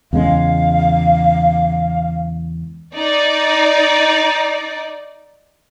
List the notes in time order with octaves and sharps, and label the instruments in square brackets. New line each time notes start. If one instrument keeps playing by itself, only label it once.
[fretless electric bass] E2 C#3 G#3 [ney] F5
[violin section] D#4 D5